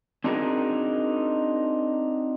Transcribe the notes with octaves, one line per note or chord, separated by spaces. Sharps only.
C4 D4 D#4 F#4 G#4 A#4